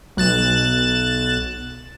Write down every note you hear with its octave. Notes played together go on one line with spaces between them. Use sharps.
B1 F#6 A6 E7